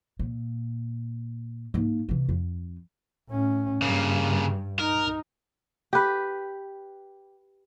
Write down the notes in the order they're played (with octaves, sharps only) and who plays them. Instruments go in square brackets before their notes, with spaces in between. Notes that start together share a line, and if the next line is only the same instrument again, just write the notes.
[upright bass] A#2
G#2 A#3
C3 E3
F2
[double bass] A2 C#4
[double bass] G2 [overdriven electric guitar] C#3 A#3
[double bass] D#4 [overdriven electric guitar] A#4
[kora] G4 B4